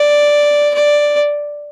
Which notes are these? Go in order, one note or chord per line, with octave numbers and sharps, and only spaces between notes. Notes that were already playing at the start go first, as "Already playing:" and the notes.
Already playing: D5
D5